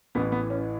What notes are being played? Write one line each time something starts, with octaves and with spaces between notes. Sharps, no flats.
A1 A2 E3 B3
B3
C#4